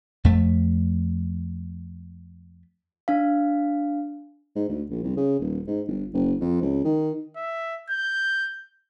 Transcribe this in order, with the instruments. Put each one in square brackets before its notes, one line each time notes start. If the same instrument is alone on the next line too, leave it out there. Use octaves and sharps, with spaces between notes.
[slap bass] F2 A3
[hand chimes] D4 F5
[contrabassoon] G#2
D2
A#1
C2
C#3
D#1
G#2
G1
F#1
F2
C#2
D#3
[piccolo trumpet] E5
G6